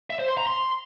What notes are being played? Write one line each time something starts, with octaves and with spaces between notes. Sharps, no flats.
E5
C5
C6
A#5
C6